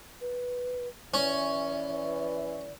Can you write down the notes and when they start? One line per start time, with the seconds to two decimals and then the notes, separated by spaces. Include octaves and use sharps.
0.21 B4
1.14 E3 C#4 D5